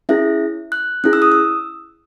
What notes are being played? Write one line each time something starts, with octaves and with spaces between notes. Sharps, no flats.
C#4 E4 G#4 E5
F#6
C#4 E4 G#4 F#6
E6
D#6
E6